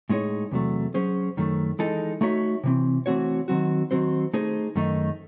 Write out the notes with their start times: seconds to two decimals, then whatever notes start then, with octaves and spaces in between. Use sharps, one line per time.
0.10 A2 G#3 D#4 G#4 C#5
0.51 E2 C3 F#3 A3
0.94 F#3 C#4 G#4 C5
1.37 F#2 D#3 A3
1.79 E3 G#3 D#4 A4
2.21 A3 D#4 F#4 C#5 E5
2.64 C3 E3 C4
3.06 E3 A3 C4 F#4 C#5
3.48 D#3 F#3 C4 F#4
3.91 D#3 F#3 C4 F#4 C5
4.33 A3 D#4 G#4 C5
4.75 F#2 D#3 A3 D#4